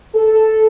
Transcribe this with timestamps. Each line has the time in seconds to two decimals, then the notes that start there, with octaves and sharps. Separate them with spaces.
0.15 A4